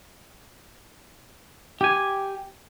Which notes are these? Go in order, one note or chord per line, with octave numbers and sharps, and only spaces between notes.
G4 G#5